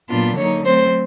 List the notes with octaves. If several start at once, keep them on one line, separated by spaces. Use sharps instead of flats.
A#2 F#3 B3 D4 F4
D3 F#3 A#3 D#4 C#5
F#3 A3 C4 C5